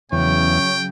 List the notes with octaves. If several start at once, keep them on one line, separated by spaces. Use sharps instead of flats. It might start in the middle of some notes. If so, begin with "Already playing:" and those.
E2 C#3 F#3 C#5 G5